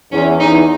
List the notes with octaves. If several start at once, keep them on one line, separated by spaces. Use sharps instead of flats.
E2 C#4
E2 D#4